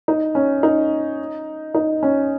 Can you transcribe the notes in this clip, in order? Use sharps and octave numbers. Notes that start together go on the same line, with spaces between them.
D#4
C#4
D#4
D#4
C#4